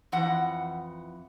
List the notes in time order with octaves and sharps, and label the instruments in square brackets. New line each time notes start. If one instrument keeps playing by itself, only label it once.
[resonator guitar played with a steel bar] F2 E3 F#5